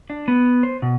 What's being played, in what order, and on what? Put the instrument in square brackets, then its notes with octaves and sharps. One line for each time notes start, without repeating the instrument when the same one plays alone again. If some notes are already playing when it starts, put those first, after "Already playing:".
[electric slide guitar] D4
B3
C5
B2